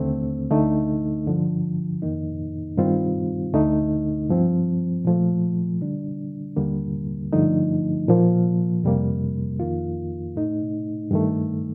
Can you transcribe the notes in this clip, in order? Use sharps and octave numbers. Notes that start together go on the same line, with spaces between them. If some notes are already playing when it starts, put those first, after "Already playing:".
Already playing: D#2 D3 A3 C4
D2 D3 A3 D#4
G2 D3 F3
F2 D#3 A#3 D#4
G2 D#3 G3 C4 F4
D2 D3 A3 D#4
G2 F3 C4
A#2 F3 A3
D3 G3 D4
D#2 D3 G3 A#3
G2 D3 F3 A3 D#4
A#2 F3 A#3
F2 C3 G3 A#3
F2 D#3 A#3 F4
A2 A3 D#4
G2 D#3 A3